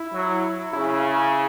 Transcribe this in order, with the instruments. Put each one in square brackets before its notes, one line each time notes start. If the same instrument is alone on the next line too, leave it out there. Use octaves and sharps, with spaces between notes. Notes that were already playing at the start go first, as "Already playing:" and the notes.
Already playing: [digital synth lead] E4
[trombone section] F#3
[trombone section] C#3 [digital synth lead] E4